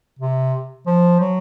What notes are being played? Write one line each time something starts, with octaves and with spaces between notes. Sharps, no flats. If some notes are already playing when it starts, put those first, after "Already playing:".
C3
F3
F#3